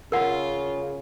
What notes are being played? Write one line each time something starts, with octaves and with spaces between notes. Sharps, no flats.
C#3 F4 A#4 F#5